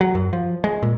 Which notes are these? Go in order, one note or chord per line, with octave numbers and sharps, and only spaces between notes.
F#3
F#2
F3
G#3
A#2